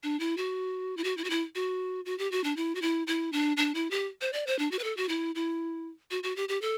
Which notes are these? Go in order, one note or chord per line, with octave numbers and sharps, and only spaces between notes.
D4
E4
F#4
E4
F#4
E4
F#4
E4
F#4
F#4
G4
F#4
D4
E4
F#4
E4
E4
D4
D4
E4
G4
C5
D5
C5
D4
F#4
B4
A4
F#4
E4
E4
F#4
F#4
G4
G4
A4